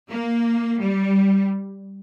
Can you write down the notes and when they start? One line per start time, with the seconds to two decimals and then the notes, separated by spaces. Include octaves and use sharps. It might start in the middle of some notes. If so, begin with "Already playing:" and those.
0.11 A#3
0.81 G3